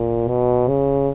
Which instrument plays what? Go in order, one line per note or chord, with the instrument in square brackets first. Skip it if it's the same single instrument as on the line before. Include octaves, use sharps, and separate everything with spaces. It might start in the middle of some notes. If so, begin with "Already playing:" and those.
Already playing: [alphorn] A#2
B2
C#3